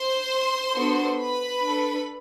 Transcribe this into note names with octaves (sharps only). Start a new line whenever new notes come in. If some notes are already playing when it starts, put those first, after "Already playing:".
Already playing: C5 C6
B3 D4 F#4 A4
B4 B5
D4 A4